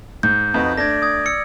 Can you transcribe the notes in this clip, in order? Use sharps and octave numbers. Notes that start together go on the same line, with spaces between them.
G#2 G6
F2 D#4 F#4 B4
A3 D4 D5 G#6 A#6
D#6 G#6
E6 C#7